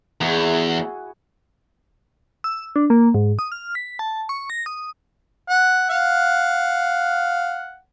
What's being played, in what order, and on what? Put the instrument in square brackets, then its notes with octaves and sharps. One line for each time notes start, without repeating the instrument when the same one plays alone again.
[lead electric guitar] E2 [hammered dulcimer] E4 F#4 G#4
[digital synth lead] E6
D4
A#3
G#2
D#6
F6
B6
A5
C#6
A#6
D#6
[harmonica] F#5
F5 F#5